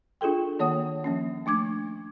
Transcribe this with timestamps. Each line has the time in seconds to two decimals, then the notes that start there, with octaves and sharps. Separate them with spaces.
0.21 D4 F4 G#4 A4 G5
0.59 D#3 A#3 C#5 F#5 D#6
1.04 F3 A#3 C#4
1.46 A3 D4 D6 G#6